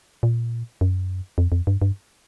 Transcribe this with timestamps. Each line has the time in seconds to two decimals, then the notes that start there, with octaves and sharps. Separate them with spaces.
0.23 A#2
0.81 F#2
1.38 F2
1.52 F2
1.67 G2
1.82 G2